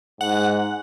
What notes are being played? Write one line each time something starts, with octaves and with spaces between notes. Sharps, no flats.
G#2 F#5